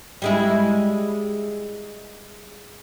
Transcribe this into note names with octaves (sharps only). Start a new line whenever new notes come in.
G3 G#3 E4